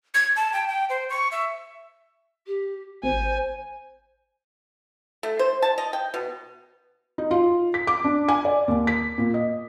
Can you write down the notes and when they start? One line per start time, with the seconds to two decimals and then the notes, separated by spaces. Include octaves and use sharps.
0.15 G#6
0.36 A5
0.53 G5
0.68 G5
0.89 C5
1.10 C#6
1.32 E5
2.47 G4
3.03 G#1 C5 G#5
5.23 A3
5.39 C5
5.62 A5
5.78 D#5
5.93 G5
6.14 B2
7.18 D#4
7.31 F4
7.74 B6
7.87 D6
8.04 D4
8.28 G#5
8.45 D5
8.68 D#2
8.87 B6
9.18 A#2
9.34 D#5